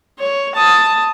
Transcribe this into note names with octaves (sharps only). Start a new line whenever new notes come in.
C#5
A5 D#6